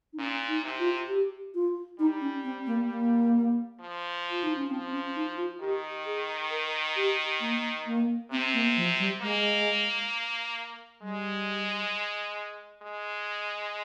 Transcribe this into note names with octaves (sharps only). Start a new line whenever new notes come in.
D#4
A#2 C#4
D#4
C3
F4
G4
F4
G3 D#4
C#4
C4
A#3
A#3
F3
F4
D#4
C#4
F3 C4
C#4
D#4
F4
D#3 G4
G#4
A#4
G4
A#3
A#3
C3 C4
A#3
F3
G3
G#3 A#3
G3 G#3
G#3